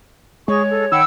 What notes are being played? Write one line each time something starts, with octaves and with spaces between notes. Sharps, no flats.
G#3 G#4 C#5 C#6
A4
D#3 F#5 G5 B5 E6